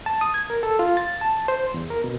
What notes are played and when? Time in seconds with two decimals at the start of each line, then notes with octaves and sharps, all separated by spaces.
0.06 A5
0.21 D#6
0.34 G#6
0.50 A#4
0.63 A4
0.79 F4
0.97 A6
1.21 A5
1.48 C5
1.74 E2
1.90 A#4
2.04 B2